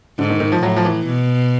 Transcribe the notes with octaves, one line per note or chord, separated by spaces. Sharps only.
G#2 D3
D#3
D#3
F3
A2 F#3
F3
E3
B2